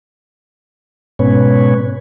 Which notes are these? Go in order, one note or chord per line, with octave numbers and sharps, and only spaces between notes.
G#2 B2 C#4 B4 C#5